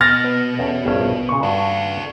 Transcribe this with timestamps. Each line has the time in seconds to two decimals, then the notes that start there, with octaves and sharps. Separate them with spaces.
0.01 B2 F6 A6 A#6
0.24 B3
0.59 E2 C#4 A4
0.86 A#1 G2 C#4
1.29 A#2 C#3 C#6
1.43 G2 F#4 A4 F#5 A#5